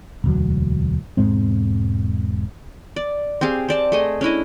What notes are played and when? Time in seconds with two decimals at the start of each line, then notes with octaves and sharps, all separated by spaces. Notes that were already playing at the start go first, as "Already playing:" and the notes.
0.24 E1 D2 F#3
1.17 E1 G#2 G#3 C4
2.96 D5
3.41 C4 G4 G#4 F5
3.69 C4 D5 A5
3.92 A3 G#4 D#5
4.21 C#4 D4 E4 D#5